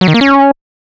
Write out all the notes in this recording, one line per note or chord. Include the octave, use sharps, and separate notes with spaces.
F#3
D#3
A#3
C#4